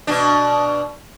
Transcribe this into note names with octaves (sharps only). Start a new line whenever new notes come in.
B2 D4